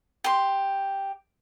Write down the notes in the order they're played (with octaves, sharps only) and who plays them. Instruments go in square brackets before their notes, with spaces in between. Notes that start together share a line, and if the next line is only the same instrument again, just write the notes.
[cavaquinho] G4 C6